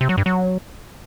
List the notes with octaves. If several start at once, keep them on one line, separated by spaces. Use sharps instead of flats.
C3
F#3
G2
F#3